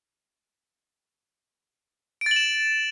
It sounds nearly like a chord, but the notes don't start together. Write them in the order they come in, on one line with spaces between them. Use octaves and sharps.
D7 A6 F#7 E7